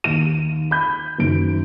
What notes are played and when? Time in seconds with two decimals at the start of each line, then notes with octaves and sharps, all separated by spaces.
0.04 D#2 D#7
0.71 B5 G6
1.18 F#1 F#2 D#3 D7